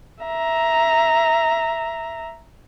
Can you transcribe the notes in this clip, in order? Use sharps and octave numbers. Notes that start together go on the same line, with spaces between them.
E5 A#5